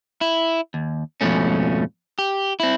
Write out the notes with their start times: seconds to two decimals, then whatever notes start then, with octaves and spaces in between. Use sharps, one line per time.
0.21 E4
0.74 D#2
1.21 F2 G#2 B2 F3 A3 C#4
2.19 G4
2.60 C4 E4